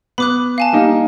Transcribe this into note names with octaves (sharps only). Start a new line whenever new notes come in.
B3 B5 D6 F#6
F5 G#5 A5
G3 A#3 D#4